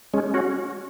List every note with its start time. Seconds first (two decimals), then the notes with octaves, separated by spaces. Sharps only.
0.14 G#3 C#4
0.34 C#4 F#4